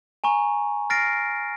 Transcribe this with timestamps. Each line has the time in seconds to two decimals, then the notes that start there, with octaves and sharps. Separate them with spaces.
0.24 G#5 A#5 C#6
0.90 F6 A6 A#6 C7 D7